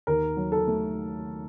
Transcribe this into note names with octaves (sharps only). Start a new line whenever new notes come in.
D#2 A#4
F#3
A4
A3